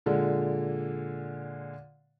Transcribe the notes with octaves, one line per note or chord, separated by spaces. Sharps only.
A#2 D3 G#3